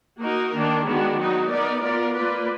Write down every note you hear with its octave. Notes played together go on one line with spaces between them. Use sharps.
A#3 D#4 F#4 A#4
D#3 A#3 D4
D#3 G#3 B3 D4 F#4
F#3 B3 D#4 F#4
B3 D#4 A#4 D5
B3 F4 A#4 D5
A#3 F4 B4 D5